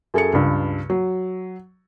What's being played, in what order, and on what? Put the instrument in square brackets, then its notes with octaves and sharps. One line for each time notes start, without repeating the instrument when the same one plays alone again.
[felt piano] F#2 G#4 A4 G#5 C#7
C#2 G2
F#3